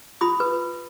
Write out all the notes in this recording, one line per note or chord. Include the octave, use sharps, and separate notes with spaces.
F4 B5 D#6
B4